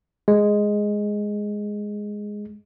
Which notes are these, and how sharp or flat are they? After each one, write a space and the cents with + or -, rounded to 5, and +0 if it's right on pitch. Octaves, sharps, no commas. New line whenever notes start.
G#3 +0